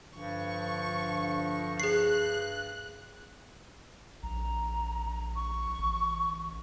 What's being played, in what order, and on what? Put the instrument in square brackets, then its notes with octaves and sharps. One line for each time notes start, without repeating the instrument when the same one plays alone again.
[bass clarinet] G2 [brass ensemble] D3 F3 [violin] C#6
[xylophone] G#4 C7 [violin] F#6
[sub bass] A#1 [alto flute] A#5
[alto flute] C#6
[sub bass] A1